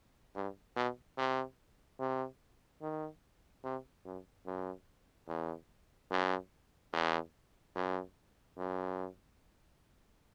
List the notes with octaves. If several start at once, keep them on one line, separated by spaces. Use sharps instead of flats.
G2
B2
C3
C3
D#3
C3
F#2
F#2
E2
F#2
E2
F#2
F#2